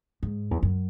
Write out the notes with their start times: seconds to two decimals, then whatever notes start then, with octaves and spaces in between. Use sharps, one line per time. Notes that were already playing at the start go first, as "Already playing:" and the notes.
0.23 G#2
0.51 E2
0.63 F#2